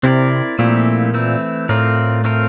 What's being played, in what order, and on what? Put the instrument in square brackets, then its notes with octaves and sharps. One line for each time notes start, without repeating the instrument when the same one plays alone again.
[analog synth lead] C3 [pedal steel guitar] C4 E4 A#4 D5
[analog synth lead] A#2 [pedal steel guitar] F3 A3 C4 E4 G4
[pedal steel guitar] E3 A3 C4 E4
[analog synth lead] A2 [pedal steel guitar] A3 C4 F4 A#4 D5
[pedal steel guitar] A3 C4 F4 A#4